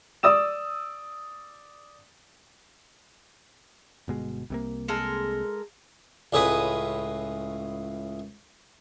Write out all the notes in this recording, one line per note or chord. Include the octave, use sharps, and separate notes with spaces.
D5 D#6 E6 E7
G1 B2 G#3
C2 C3 A#3
G#3 A4 A#4
C#2 A2 G#4 B4 D#6